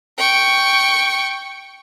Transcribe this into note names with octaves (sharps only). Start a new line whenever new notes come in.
G5 C#6